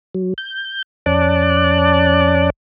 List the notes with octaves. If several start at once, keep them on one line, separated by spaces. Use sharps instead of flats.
F#3
G6
F2 C#4 D5 A5 D6 F#6